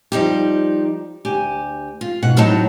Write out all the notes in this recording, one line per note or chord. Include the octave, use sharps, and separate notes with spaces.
F3 G3 D#4 G4
D2 G4 G#5
F4
G#2 B2 F#5
F2 A2 F#3 D#4 A5